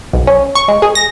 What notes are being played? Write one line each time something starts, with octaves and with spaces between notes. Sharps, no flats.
B1
C#4
C#6
G#3
G#4
A#6